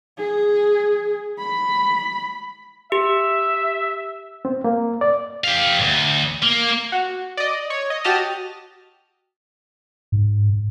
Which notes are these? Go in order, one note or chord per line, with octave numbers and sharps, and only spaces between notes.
G#4
B5
G4 E5
C4
A#3
D5
G4 F5
D2 G2
A#3
F#4
D5 D#5
C#5
D#5
F#4 G4 D#5 A5 D#6 F6
G#2